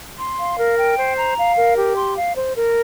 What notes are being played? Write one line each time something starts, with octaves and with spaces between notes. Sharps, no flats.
C6
F5
A#4
G5
C5
A#5
F5
A#4
G4
C6
F5
C5
A#4